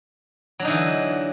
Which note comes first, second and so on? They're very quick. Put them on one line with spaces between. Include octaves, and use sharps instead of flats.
F#3 D4 D#4 D3 E3